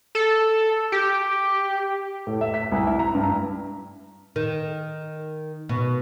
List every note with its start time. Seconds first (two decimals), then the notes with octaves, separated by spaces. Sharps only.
0.15 A4
0.92 G4
2.27 A2
2.41 E5
2.54 B6
2.72 C2
2.87 E4
2.99 A#5
3.15 G2
4.36 D#3
5.69 B2